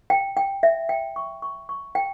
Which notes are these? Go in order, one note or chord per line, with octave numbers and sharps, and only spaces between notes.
G5
G5
E5
G5
C#6
C#6
C#6
G5